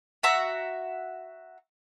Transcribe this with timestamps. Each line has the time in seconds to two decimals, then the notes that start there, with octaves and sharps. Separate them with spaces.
0.23 F#4 E5 A#5